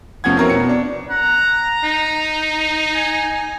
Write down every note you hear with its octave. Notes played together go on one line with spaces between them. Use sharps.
F1 F3 B3 C#4 F#5 G#6
C4 E4 F#4 A#4 B4 C#5
B2 C#7
D4
F#5 A#5
D#4
G#5